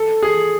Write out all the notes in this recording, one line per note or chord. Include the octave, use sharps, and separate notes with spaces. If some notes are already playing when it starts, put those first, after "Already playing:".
Already playing: A4
G#4